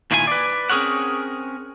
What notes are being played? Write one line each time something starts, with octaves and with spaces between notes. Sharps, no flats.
A#2 D#3 E4 F4 B4 G#5
B4 D5
C4 C#4 G#4 A#4 C#5 F#5